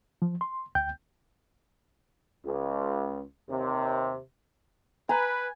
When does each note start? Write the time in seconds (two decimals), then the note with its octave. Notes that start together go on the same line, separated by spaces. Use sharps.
0.22 F3
0.41 C6
0.75 D2 G5 G6
2.46 C#2
3.49 D#2 C3
5.09 B4 G#5 A#5